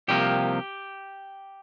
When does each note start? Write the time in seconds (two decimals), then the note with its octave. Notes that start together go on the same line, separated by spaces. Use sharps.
0.08 C2 C3 F3 A#3 G4